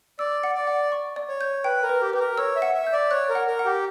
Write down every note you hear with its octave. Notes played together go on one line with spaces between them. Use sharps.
D5 E6
F#5
D5
F#5
C#6
D5
C#5
G6
B4 G5
A#4
B4
G4
G4 B4
A#4
C#5 E6
E5
F#5
E5
G6
D5
C#5 F#6
A#4
F#5
A#4
F#5
G4